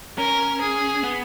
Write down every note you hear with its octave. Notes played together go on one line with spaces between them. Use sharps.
C#4 A#4
G#4
B3